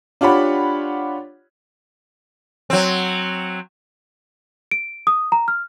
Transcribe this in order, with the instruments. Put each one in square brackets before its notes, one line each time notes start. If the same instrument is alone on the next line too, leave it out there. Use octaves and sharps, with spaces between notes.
[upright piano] D4 F4 G4 C#5 F#5 B5
[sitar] F#3 C4
[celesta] D7
D#6
A#5
F6